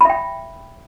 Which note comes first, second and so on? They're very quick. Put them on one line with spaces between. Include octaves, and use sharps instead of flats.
B5 E5 G5